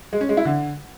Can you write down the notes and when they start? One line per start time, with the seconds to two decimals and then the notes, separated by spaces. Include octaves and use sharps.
0.13 G#3
0.21 C#4
0.29 G#3
0.37 E4
0.45 D3